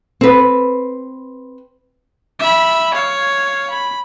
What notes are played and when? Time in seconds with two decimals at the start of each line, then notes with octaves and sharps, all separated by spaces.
0.21 C4 B4
2.40 E5 B5
2.94 C#5 F5
3.71 B5